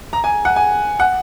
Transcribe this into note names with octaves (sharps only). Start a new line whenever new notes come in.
A#5
G#5
F#5
G#5
F#5